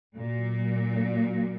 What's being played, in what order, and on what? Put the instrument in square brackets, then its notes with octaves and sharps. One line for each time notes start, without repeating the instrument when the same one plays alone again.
[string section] A#2 [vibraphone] F#4
[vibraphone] F#3
F#3
D4
F#4
F#3